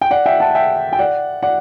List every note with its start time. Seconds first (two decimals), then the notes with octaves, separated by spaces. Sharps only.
0.01 G5
0.11 D5 F#5
0.26 E5 G5
0.40 F#5 A5
0.55 E5 G5
0.93 G5
0.99 D5 F#5
1.43 D5 F#5